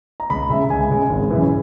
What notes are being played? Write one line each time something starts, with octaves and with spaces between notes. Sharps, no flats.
A#5
C#2 B5
C#3 G#3 E5
C#2 G#5
C#3 G#3
G#1
F#2 C#3 E3